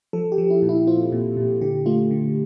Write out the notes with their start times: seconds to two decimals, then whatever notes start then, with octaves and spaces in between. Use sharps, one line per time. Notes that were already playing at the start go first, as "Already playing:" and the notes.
0.13 F3 A4
0.32 G4
0.38 F3
0.50 E4
0.62 A#2
0.69 E4
0.87 C4 F4
1.12 A#2
1.37 A#2
1.61 D3 G4
1.86 A3 F4
2.11 D3